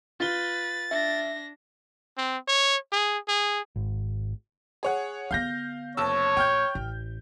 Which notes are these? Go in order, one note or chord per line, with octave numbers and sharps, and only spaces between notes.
F4 B4 A6 G7
D4 E5 A#6
C4
C#5
G#4
G#4
G#1
G#4 C#5 F#5
D3 B3 F5 G6 A#6
F#1 C#5 A5 E6
A#1 G5 F6 G6
A1